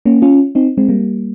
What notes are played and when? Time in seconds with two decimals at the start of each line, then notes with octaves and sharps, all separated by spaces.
0.05 A#3 C#4
0.22 C#4 F4
0.55 C4 D#4
0.78 G#3 C4
0.88 G3 A#3